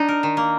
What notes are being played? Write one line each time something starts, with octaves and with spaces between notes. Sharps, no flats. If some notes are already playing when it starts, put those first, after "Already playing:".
Already playing: D4 D#4
A#4
D#3
A#3